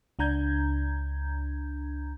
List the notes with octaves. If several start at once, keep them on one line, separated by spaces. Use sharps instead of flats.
C#2 D4 A#5 G6 G#6